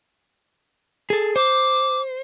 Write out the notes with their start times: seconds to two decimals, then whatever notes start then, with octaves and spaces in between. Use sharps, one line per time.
1.10 G#4 A4
1.36 C5 D6